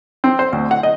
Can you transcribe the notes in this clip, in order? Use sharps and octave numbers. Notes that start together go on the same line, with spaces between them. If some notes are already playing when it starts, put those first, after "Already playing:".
C4
C5
D2
F#5
D#5